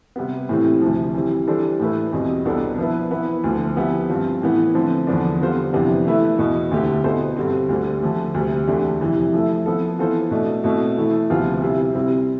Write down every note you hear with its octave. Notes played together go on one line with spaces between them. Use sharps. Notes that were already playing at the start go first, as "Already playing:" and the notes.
C3 G3 B3
A2 E3 G3 C4
D2 C3 F3
E3 G3 C4
E3 G3 D4 A4 C5
A2 E3 A3 E4 B4
E2 B2 G3 C4
C2 B2 B3 D4 A4
F3 B3 E4 B4
E3 B3 E4 B4
D2 D3 F3
F3 B3 E4 G4
G2 F3 C4 F4
A2 E3 B3
D3 F3 A3 C4
E2 D3 F3 B3 D4
D3 G3 B3 F4 C5
F2 C3 E3 B3 D4
E3 A3 E4 B4
E2 B2 B3
D2 D3 A3 E4 G4
B2 B3 E4 A4 C5
G2 D3 G3 C4
D2 D3 G3 D4
D3 F3 A3
D2 C3 G3
E2 D3 A3 D4 G4
F2 C3 E3 G3
F3 A3 E4
F3 B3 E4 A4
E3 B3 F4 A4 C5
B2 A3 D4
B2 A3 C4 E4
E3 A3 E4
D2 C3 F3 B3 F4
C3 G3 C4 E4
C3 G3 C4 E4